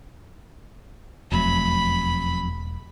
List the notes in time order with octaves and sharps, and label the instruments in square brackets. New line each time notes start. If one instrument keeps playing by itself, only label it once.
[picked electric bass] E1 A3 [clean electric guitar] F2 F#3 [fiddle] B5